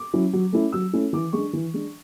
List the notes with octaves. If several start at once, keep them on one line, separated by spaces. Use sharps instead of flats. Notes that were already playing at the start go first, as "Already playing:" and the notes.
Already playing: D6
F#3 C#4 E4
F#3
A3 C#4 E4
F#3 E6
A3 C#4 E4
E3 D6
G#3 D4 C#6
E3
G#3 D4